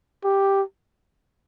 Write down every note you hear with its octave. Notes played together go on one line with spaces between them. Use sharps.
G4